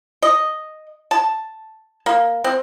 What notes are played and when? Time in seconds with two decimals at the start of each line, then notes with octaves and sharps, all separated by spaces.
0.22 D#5
1.11 A5
2.06 A#3
2.44 C4